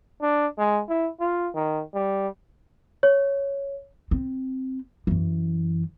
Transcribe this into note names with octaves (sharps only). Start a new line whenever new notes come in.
D4
G#3
E4
F4
D#3
G3
C#5
C4
F#2 E3